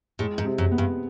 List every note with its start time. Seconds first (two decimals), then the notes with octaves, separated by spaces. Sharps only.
0.19 A2 G#3
0.38 G#2
0.45 C3
0.58 F#2
0.71 B3
0.78 G2